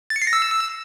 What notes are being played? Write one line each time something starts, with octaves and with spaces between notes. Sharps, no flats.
A6
C#7
C7
A#6
E6